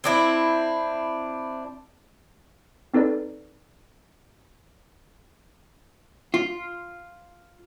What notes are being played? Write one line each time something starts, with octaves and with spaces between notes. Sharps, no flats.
C4 D4 E4
C4 D#4 A4 B4 D5
F4